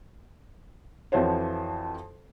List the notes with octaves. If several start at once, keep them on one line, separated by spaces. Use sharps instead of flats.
F2 E3 F3 F#4 C5 C#5